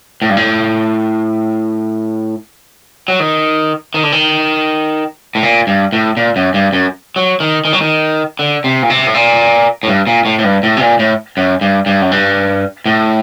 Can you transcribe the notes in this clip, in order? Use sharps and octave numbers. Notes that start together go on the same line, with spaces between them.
A2
G2
A2
F#3
D#3
D#3
D3
D#3
A2
A#2
G2
A2
A#2
F#2
G2
F#2
F#3
D#3
D#3
F#3
D#3
D3
C3
A#2
C3
A2
A#2
A2
G2
A#2
A2
A2
G2
A2
C3
A#2
A2
F#2
G2
G2
F#2
G2
A2